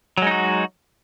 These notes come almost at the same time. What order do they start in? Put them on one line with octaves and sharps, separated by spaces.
F#3 G#3 D#4 F#4